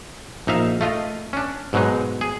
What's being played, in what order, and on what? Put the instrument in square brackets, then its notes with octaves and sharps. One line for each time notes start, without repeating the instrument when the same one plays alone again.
[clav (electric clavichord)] A#1 D#4 E5 F5
A3 F4 D#5
C#4 D4
G#2 B2 F#3 G#3 D#4
G#4